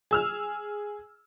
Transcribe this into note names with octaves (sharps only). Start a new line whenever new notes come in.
G#4 E6 F6